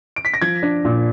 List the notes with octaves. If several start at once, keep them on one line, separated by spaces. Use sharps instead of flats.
D7
B6
A#6
F3 G#6
D4
A#2